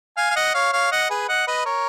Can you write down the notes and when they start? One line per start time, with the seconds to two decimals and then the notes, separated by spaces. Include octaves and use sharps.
0.17 F5 G#5
0.31 F5
0.36 D#5 F#5
0.54 C#5 F5
0.73 C#5 F5
0.92 D#5 F#5
1.10 G#4 B4
1.29 D#5 F#5
1.47 B4 D#5
1.66 A#4 C#5